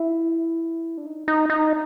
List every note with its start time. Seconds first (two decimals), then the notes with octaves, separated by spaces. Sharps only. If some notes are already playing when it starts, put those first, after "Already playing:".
Already playing: E4
0.98 D4
1.06 D#4
1.28 D#4
1.50 D#4